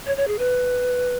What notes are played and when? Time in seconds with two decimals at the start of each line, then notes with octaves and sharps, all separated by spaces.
0.06 C#5
0.17 C#5
0.28 G#4
0.39 B4